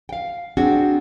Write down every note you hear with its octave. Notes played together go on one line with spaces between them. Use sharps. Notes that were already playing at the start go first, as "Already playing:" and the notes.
F5 G5
C4 D4 F#4 G#4